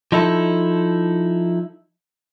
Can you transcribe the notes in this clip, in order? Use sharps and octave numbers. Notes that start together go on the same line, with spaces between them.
F3 D#4 E4 A4